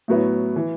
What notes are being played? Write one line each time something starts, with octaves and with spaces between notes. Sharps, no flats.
A2 F#3 B3 E4
E3